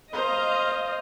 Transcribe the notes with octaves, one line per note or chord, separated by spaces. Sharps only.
C5 D#5 F5 A#5